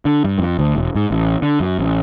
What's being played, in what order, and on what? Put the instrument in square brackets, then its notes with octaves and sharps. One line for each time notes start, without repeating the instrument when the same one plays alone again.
[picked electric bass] D3
G2
F2
D2
E1
G#2
A1
D3
F#2
A1